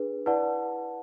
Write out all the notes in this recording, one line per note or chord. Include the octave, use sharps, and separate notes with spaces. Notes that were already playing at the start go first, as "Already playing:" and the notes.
Already playing: D4 G#4 B4
E4 B4 D5 F#5 A5